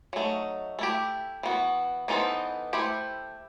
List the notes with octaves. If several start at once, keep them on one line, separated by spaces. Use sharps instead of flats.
F#3 A3 D#4
A3 E4 G4
E3 B3 F#4
E3 B3 D#4 A4 C5
A3 E4 G4 C5